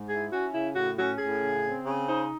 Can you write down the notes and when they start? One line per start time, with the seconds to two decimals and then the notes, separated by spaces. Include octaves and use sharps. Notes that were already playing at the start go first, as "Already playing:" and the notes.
Already playing: G#2
0.09 E4 G#4
0.30 C#4 F#4
0.52 C#3 E4
0.74 A2 F#4
0.97 C#4 F#4
1.18 A2 G#4
1.41 C#3
1.63 C4
1.84 C#3
2.06 D#4 C5